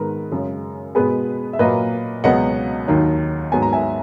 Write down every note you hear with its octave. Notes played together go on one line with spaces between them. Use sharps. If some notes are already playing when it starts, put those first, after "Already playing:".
Already playing: G#2 D#3 G#3 B3 A#4 B4
F#2 C#3 G#3
B2 G#3 B3 G#4 B4
E5
A#2 F#3 A#3 B4 D#5
C#2 B2 F#3 B3 D#5 F#5
D#2 D#3 F#3
G#2 F#3 B3 G#5
A#5
E5 G#5